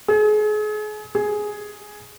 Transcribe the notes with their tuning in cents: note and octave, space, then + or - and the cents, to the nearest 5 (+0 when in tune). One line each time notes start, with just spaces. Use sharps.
G#4 +35
G#4 +5